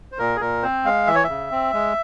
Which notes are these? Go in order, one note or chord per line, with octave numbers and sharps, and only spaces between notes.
C5
A#2 A#4
G#4
A#2 A#4
C4 C5
G#3 F5
E3 E5
C#5
E5
C#3
C4
G#3